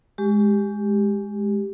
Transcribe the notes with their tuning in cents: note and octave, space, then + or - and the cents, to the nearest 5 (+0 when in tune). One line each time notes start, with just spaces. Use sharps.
G#3 +0 G4 +0